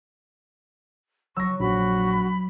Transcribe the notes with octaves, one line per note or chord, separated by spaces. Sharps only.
F#3 C#6 E6 A#6
A#1 F#4 B5